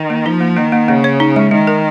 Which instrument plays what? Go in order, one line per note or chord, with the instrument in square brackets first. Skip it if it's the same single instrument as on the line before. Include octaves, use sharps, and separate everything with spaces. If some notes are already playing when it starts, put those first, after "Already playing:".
Already playing: [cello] D#3
[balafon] A#3
[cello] F3 [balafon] D#4
[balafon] A#3
[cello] D#3 [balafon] A#3
[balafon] A#3
[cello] C#3 [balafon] A#3
[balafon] C#5
D#4
G#3
[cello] D#3 [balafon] G#3
[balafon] A#4